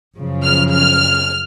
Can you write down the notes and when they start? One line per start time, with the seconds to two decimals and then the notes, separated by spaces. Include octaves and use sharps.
0.16 F#2 C#3 F3
0.44 F6
0.73 F6